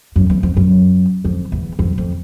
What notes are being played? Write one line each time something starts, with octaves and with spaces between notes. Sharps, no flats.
F#2
E2
F2
F#2
F2
E2
F2
F2